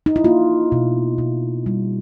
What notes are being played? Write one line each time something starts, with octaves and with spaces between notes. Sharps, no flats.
D#4
E4
A#3 F4
B2
B2
G3